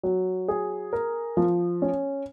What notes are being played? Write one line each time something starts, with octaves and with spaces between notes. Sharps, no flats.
F#3
G#4
A#4
F3
C#4